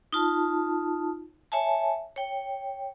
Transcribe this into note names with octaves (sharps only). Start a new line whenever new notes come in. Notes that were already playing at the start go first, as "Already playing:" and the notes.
D#4 F4 A5
C#5 E5 G#5 A5
C#5 G5